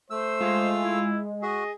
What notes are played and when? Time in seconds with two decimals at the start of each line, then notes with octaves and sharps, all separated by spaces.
0.10 A3 C5 E6
0.41 G#3 F4
0.83 E4
1.42 F#4 G#4 D#5